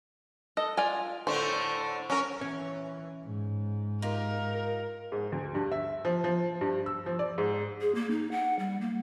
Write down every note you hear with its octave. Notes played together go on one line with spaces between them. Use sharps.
A4 D#5
F4 D5 G#5
A2 D3 A3 C5
F#3 C#4 A#4
E3 C#4
G#2
D#4 F4 G4 A#4
G#2
D2
G2
E5
F3
F3
G2
E6
F3
D5
G#2
G#4
A#3
D#4
F#5
G3
A#3